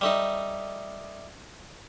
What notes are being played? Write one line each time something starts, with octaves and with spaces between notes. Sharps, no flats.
G3 A3 D#4